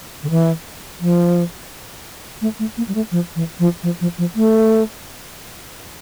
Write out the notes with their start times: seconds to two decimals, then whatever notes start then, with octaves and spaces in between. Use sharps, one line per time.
0.23 D3
0.30 E3
1.00 F3
2.41 A3
2.59 A3
2.77 A#3
2.88 G3
2.95 A3
3.12 F3
3.36 E3
3.59 F3
3.83 F3
4.01 F3
4.18 F3
4.35 A3